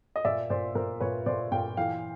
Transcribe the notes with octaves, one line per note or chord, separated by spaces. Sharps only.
D#5
A#2 D5 E5
A#2 C5 D5
A#2 A#4 C5
A#2 B4 C#5
A#2 C5 D5
A#2 F5 G5
E3 F5 G5